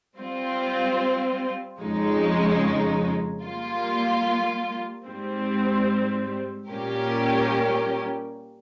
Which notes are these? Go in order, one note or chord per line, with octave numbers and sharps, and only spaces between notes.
G3 C4 F4
F2 C#3 G#3 D#4
G3 A#3 F4
G#2 G3 C4
A#2 G3 C#4 G4 A#4